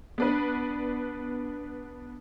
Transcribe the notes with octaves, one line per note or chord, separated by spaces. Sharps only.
B3 D4 B4